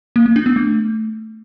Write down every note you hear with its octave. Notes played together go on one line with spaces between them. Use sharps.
A#3
A#3
D4
B3
A3